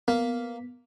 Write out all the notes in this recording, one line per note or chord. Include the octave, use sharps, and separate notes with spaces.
A#3 B3